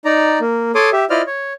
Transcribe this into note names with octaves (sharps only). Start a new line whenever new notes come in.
D#4 D5 A#5
A#3
A4 C#5 C6 D6 D#6
G4 E5
E4 F4 C5 D5 D#5 F6
C#5